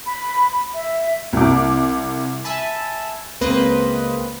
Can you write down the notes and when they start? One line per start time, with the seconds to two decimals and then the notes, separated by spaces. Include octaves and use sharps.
0.06 B5
0.74 E5
1.33 C2 D6
2.44 E5 G#5 A5 B5
3.41 C#2 A#3 C4 B4 C5 D#5